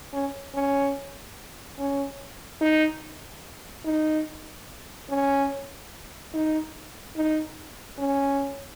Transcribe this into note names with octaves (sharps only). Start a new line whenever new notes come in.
C#4
C#4
C#4
D#4
D#4
C#4
D#4
D#4
C#4